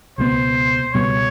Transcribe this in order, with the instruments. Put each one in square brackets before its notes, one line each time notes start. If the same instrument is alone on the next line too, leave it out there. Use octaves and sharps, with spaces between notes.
[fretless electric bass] C#2 B2 G3 B3 [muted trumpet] C5
[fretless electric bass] C#2 B2 G3 B3 [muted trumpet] C#5